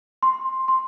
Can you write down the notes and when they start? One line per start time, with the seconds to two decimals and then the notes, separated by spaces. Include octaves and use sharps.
0.23 C6
0.68 C6